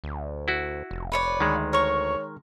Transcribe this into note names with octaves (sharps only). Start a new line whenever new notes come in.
D2
E4 F#4
F1
B4 C#5 D5
D2 D#3 G#3
A#4 C#5 C#6